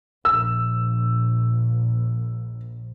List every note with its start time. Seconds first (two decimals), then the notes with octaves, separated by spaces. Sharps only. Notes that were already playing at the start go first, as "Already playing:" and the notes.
0.25 A#1 E6